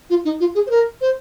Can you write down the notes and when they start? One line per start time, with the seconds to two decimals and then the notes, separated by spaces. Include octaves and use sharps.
0.10 F4
0.25 D#4
0.40 F4
0.55 G#4
0.66 C5
0.70 A#4
1.01 C5